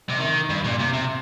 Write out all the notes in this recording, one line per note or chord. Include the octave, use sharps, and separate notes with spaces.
C3
D#3
G2
A#2
C3
C3